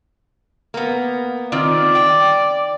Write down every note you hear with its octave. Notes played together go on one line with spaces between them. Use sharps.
A#3 B3
D#3 C4 F4 D5
G5